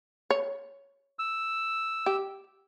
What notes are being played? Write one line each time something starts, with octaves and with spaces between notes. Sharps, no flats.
C#5
E6
G4